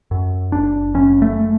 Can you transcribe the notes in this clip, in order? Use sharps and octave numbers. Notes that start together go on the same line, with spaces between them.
F#2
F#1 D4
F#2 C#4
A3